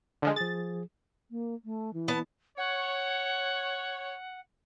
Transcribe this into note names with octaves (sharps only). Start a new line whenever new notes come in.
D3 F3 G#3
F3 G#4 A6
A#3
A3
E3
B3 A5
C#5 F#5